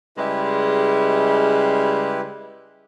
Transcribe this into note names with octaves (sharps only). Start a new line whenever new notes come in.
C#3 G3 G#3 E4 G4 B4